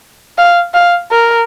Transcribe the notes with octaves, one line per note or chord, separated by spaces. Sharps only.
F5
F5
A#4